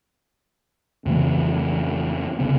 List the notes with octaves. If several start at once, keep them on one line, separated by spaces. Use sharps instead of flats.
F2 C#3 E3 A3
C2 F#2 C#3 B3